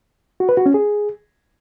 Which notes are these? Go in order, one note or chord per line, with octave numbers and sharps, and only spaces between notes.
F#4
B4
F#4
C#4
G#4